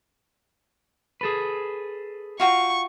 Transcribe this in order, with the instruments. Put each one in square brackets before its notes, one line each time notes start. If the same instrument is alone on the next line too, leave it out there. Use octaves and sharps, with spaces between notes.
[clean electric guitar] G#4 A4 B4
[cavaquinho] F4 F#4 G5 [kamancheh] C#6